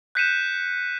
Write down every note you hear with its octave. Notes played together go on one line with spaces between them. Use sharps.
F#6 G6 B6 C#7 D#7 E7